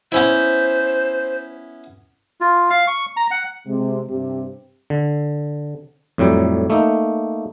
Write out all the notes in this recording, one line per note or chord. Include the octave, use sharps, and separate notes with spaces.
B3 C#4 E4 C5
F4
F5
C#6
A#5
F#5
C3 G#3
G2 C3 G4
D3
F2 A2 F#3 G3
A3 A#3 D#4